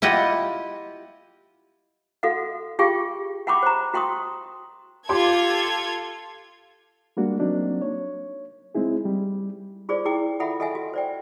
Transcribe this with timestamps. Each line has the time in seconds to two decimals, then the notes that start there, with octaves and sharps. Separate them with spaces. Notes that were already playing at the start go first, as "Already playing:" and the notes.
0.02 E4 F4 G4 D#5 F#5
2.23 F#4 A4 F5 F#5
2.79 F4 G4 G#4 F5 G5 C#6
3.47 F#5 G5 B5 C#6 D6
3.63 C5 A#5
3.94 F#4 G5 C6 C#6 D#6
5.09 F4 G4 A4 C6 D6 G#6
7.17 G3 G#3 A#3 D4 F#4
7.39 F#3 A#3 C4 D4 D#4
7.82 C#5
8.75 G#3 C4 D#4 E4 G#4
9.05 G3
9.89 F4 G#4 C5 D5
10.05 E4 G#4 G5 D6
10.40 F4 A4 E5 F#5 B5
10.60 A4 D#5 E5 F#5 G#5
10.75 F#4
10.94 C5 D5 G5